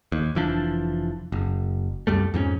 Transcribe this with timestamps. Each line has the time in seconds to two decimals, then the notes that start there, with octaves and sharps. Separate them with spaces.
0.12 D#2
0.35 F1 E3 F3 D4
1.32 F#1
2.07 C2 F#2 G3 A3
2.34 F2 G#2 C4 C#4